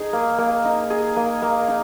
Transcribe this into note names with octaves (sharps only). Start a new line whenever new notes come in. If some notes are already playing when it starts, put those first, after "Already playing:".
Already playing: D#4 G#4
A#3
A#3
D#4
G#4
A#3
A#3
D#4